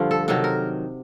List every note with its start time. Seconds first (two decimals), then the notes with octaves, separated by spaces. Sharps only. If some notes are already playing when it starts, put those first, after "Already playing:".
Already playing: G2 D3 F3 F4
0.11 A4
0.28 C3 D#3 F#3 A4
0.44 A#4